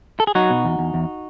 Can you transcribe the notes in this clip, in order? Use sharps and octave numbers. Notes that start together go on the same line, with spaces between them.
A4
G#4
F#3 D#4 F#4
B2
E2
E2
E2